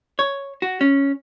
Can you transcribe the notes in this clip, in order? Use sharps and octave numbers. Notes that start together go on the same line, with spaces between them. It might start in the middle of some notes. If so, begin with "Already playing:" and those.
C#5
F#4
C#4